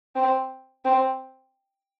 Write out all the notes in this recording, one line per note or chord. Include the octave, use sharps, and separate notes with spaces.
C4
C4